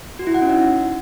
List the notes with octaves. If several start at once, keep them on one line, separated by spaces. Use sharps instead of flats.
F#4
E4
F#5
C#4
D#4